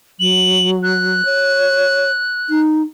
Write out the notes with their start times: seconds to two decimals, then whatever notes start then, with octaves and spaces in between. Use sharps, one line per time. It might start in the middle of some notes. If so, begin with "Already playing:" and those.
0.20 F#3 F#7
0.83 F#6
1.25 C#5
2.50 D#4